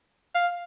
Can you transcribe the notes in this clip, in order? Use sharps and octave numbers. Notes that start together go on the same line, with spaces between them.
F5